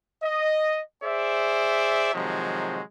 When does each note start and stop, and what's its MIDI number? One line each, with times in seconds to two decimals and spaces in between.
0.22 0.79 75
1.03 2.13 68
1.03 2.13 72
1.03 2.13 74
1.03 2.13 76
2.13 2.80 48
2.13 2.80 51
2.13 2.80 53
2.13 2.80 54
2.13 2.80 56